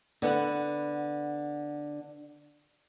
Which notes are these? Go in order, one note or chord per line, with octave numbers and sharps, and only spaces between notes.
D3 B3 F#5